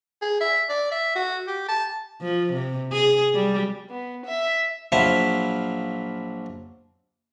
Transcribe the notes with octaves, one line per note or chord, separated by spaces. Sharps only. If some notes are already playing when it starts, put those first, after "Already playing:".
G#4
E5
D5
E5
F#4
G4
A5
F3
C3
G#4
G3
B3
E5
A#1 F3 F#3 E4 E5 F5